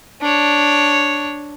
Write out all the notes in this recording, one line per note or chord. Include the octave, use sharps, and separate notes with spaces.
D4 C#5